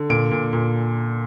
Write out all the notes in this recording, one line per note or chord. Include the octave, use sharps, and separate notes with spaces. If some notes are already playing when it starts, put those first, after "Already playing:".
Already playing: D3
A#2 D7
A#2
A#2